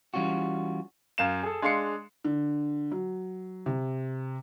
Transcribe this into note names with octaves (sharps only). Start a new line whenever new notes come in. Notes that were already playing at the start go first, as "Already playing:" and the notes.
E3 G3 C#4 F4 F#4
F#2 F5 E7
G#4 A4
G#3 D4 F5 C6 C7 C#7
D3
F#3
C3